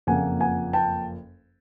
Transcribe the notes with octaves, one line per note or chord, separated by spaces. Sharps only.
F#1 F2 C#3 F3 A#3 F#5 G#5
F#5 G#5
G5 A5